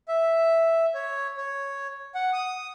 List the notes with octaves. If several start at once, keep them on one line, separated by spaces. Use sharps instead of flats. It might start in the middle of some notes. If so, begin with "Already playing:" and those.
E5
C#5
C#5
F#5
D#6